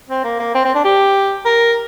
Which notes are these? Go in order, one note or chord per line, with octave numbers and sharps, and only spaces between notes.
C4
A#3
A#3
C4
C4
D4
G4
A#4